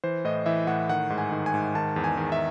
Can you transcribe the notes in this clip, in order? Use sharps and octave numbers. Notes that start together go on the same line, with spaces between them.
E3 C5
A2 D#5
E3 E5
A2 F#5
D#3 F#5
G#2
G#5
D#3
G#5
G#2
D#3 A5
E2
G#5
D#3
E5